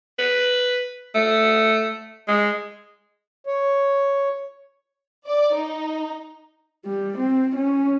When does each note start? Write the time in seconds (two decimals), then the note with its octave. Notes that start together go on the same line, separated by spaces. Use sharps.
0.19 B4
1.15 A3
2.28 G#3
3.47 C#5
5.26 D5
5.56 D#4
6.86 G3
7.18 C4
7.56 C#4